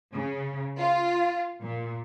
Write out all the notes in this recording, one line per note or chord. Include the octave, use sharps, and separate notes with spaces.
C#3
F4
A#2